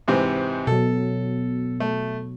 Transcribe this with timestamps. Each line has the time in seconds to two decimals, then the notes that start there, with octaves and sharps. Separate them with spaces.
0.08 G#2 C3 E3
0.67 B2 F#3 A4
1.80 A3